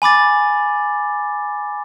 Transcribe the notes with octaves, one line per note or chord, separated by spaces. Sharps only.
G#5 B5 D6 A6